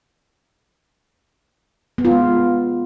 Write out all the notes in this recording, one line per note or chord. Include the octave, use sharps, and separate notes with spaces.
B3
F4
G#3